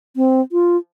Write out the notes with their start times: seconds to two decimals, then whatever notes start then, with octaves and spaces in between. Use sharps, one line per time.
0.16 C4
0.52 F4